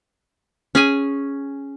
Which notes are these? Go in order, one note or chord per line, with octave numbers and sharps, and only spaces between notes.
C#4 G#4 G#5